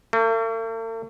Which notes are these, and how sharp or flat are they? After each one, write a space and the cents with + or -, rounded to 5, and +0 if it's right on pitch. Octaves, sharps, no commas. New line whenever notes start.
A3 +45